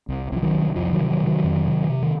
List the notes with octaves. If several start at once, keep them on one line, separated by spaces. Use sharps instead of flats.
C2
C2 F3
D#3 F#3
C2
F2 F3
D#3 F#3
C3
D#3 F#3
C3
D#3 F#3
F2
C3
C3
D#3